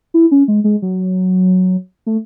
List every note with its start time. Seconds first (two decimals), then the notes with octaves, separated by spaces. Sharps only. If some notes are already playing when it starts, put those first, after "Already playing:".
0.14 E4
0.31 C#4
0.48 G#3
0.64 G#3
0.82 F#3
2.06 A3